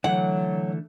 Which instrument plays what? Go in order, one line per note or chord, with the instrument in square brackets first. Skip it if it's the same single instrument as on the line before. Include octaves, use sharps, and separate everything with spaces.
[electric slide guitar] D3 E3 A3 [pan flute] F#3 [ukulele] F#5